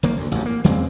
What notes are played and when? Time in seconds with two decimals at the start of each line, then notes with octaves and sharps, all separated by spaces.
0.03 F#1 D#3 A#3
0.17 D2
0.32 A1 F2
0.46 A#3
0.64 E2 C#3 G#3 C4